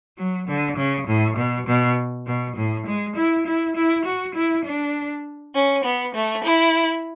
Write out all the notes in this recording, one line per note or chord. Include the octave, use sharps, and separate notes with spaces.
F#3
D3
C#3
A2
B2
B2
B2
A2
G#3
E4
E4
E4
F#4
E4
D4
C#4
B3
A3
E4